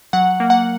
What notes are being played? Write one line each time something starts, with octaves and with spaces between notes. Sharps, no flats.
F#3 F#5
A#3
F#5